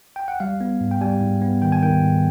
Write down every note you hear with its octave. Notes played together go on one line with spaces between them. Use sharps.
G5
F#5
G3 F5
B3
G#2
G5
G3 G#5
G#2
B3
D#3 G5
G#5
D#3 G5
G#2